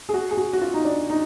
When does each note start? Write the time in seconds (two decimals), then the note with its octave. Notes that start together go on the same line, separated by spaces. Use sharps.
0.09 G#4
0.14 F#4
0.31 G#4
0.37 F#4
0.53 F#4
0.62 F4
0.74 D#4
0.85 D4
1.10 D#4